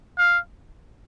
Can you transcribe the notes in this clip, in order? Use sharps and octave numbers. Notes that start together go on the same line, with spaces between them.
F5